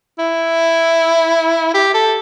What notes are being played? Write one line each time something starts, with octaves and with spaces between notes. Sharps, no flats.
E4
G4
A4